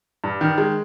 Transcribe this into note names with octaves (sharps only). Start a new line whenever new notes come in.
G2
D#3
G#3